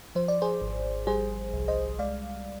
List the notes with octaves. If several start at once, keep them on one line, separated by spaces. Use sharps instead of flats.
F3 C5
D5
G#4 C5
G#1
G3 G#4 C5
C2
C5 D#5
G#3 D5 F5